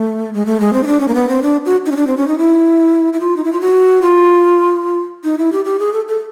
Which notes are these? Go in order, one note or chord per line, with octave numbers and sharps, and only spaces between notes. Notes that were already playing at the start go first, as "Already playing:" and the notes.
Already playing: A3
G#3
A3
G#3
C4
D#4
D4
C#4
A#3
B3
C4
D4
F#4
D#4
C#4
D4
C4
C#4
D#4
E4
E4
F4
D#4
E4
F4
F#4
F4
D#4
E4
G4
G4
G#4
A4
A4